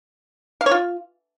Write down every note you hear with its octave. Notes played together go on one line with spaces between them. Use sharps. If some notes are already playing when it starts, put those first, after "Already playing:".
F5
C#5
F4